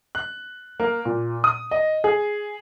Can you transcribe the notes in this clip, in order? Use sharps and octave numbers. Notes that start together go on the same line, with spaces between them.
F#6
A#3
A#2
D#6
D#5
G#4